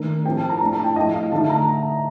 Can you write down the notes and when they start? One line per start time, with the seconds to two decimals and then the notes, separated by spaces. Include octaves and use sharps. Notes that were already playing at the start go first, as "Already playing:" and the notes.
Already playing: D#3 A3 D4 A#4
0.25 A2 F3 C4 G5
0.37 A5
0.49 A#5
0.61 A2 A3 D4 A#5
0.72 A5
0.84 G5
0.96 A2 F3 A3 D#5
1.14 F5
1.32 D3 A3 D#4 A5
1.50 A#5